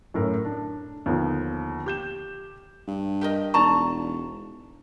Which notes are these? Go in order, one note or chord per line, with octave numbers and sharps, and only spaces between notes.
F#2 A2 A#4
D4
D#2 D3 F3 B3
G4 G6 E7
G2
G4 A#4 D#5
E1 D#4 D5 A5 A#5 C#6